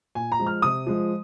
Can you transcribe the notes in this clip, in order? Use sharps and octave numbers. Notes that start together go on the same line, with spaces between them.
A#2 G#5
A#5
F3 G#3
F6
C3 D#6
F3 G#3